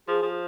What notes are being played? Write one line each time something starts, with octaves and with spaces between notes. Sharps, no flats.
F3 G#4
F3